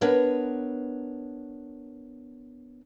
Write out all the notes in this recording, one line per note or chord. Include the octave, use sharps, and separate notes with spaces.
B3 D4 A#4 B4 C#5